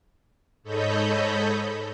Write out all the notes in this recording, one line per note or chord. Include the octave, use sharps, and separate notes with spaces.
G#2 A4 C#5 D#5 B5 G6